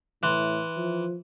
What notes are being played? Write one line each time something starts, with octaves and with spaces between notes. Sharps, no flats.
A2 E3 E5 C6 F#6
F3